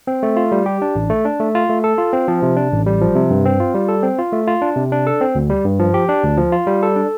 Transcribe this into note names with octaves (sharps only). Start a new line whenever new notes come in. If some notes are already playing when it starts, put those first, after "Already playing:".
C4
A3
F4
G3
G4
D4
A1
A3
D4
A3
F4
A3
A4
F4
C4
F3
C3
D4
A1
G3
F3
C3
G2
C4
F4
G3
A4
C4
F4
A3
F4
D4
C3
D4
A4
C4
D2
G3
G2
F3
G4
D4
D2
F3
F4
G3
A4
D4